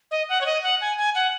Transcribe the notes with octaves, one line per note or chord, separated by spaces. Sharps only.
D#5
F#5
C#5
D#5
F#5
G#5
G#5
F#5